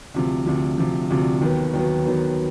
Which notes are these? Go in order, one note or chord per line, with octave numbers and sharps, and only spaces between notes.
D2 C3 F3
D2 C3 F3
D2 C3 F3
D2 C3 F3
D#2 D#3 F#3 B3
D#2 D#3 F#3 B3
D#2 D#3 F#3 B3